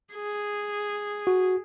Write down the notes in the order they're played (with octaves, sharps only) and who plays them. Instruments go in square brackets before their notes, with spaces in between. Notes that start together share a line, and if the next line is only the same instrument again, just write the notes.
[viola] G#4
[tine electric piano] F#4